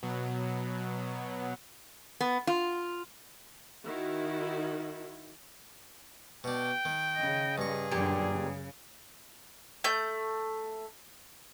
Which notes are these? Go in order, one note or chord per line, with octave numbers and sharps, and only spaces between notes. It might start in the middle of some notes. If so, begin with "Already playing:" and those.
B2 F#3
B3
F4
D#3 E4 F#4
B2 D4 G5
D#3
C#3 D#5
G2 G#4 C#6
F#2 A#2 D3 G3 G4
C#3
A3 G6